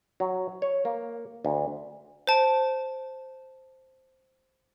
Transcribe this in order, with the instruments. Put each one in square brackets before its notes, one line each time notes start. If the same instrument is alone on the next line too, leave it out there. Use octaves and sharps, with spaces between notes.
[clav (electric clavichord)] F#3
C#5
A#3
D2
[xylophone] C5 A5 D7